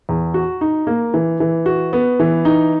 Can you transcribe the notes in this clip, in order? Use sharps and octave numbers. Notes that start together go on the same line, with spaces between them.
E2
F#4
D#4
A#3
E3
E3
F#4
B3
E3
D#4